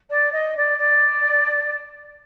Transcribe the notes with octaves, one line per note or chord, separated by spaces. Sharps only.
D5
D#5
D5
D5